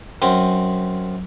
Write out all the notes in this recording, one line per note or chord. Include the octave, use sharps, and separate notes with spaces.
F#2 C4